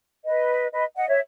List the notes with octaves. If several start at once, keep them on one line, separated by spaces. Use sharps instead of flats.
B4 D#5
B4 D#5
D#5 F#5
C#5 E5